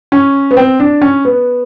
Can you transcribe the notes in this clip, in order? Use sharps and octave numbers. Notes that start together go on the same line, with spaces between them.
C#4
B3
C4
D4
C#4
B3